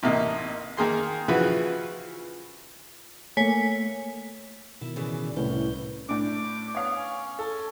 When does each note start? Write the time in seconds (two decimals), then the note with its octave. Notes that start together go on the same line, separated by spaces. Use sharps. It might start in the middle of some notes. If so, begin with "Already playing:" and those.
0.03 A1 C3 A#3 D#4
0.77 D#3 A#3 G#4 C6
1.28 C#3 E3 F3 F#4 B4
3.37 A3 A#3 C#5 G#5 B6
4.81 B2 D#3 E4
4.96 C#3 E3 D5
5.36 C2 A2 C#4 B4 G6
6.09 A2 D4 D6
6.75 B3 C#5 F5
6.96 C#4
7.39 A4